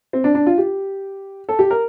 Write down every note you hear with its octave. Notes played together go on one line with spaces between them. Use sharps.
C4
D4
D4
F4
G4
A4
G4
A#4